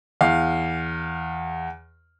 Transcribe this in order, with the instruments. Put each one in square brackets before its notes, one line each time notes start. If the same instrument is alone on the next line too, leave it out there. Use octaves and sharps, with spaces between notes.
[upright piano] E2 F5